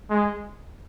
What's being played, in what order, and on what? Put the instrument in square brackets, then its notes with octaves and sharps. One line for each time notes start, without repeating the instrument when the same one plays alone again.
[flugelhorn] G#3